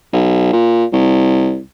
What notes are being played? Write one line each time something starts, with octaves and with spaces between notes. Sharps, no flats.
B1
A#2
C2